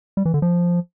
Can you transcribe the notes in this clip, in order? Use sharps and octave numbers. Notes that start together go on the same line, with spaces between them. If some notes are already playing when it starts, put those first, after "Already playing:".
G3
E3
D3
F3